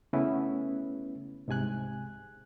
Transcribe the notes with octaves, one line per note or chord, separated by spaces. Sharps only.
C#3 A3 B3 C#4 E4 B4
C2 G#2 C3 G#5 F#6